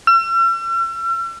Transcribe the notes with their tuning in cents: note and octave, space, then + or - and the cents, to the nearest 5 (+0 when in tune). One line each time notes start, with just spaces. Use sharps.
E6 +45